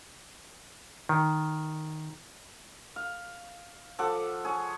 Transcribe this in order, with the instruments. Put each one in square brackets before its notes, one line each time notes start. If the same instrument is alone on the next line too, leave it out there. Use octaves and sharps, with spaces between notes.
[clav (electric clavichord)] D#3
[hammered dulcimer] F5
F3 A4 F#5 D6
G#4 C#5